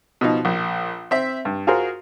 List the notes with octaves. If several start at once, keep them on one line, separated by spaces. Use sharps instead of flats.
B2 F3 D#4
A#1
C4 E5
G2
F4 F#4 G#4 A#4 C5